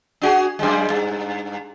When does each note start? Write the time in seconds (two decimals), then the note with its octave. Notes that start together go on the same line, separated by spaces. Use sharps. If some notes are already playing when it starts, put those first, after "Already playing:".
0.22 D4 F#4 G#4
0.59 F#2 G3 G#3
0.90 G2